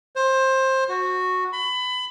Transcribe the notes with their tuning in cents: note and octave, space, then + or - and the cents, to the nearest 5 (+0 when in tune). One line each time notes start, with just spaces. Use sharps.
C5 +20
F#4 -10
B5 +25